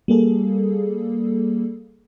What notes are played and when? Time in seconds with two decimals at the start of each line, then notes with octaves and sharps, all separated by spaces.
0.08 G3 A#3 G#4 A4